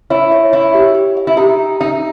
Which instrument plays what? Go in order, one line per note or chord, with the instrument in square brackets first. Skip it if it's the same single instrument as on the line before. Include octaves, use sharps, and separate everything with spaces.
[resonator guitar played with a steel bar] E4 [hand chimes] C#5
[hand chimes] C#5
[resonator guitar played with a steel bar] E4 [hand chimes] C#5
[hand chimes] G4
G4
E5
[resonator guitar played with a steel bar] E4
[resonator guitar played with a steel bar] D#4 [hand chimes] G4
[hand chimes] G4
[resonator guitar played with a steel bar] D#4 [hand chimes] E5